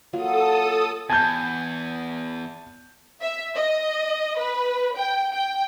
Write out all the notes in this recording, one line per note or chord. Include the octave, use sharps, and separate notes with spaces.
F#3 A#3 F4 A4 D#6
E2 G#5 A5 G6
E5
D#5
B4
G5
G5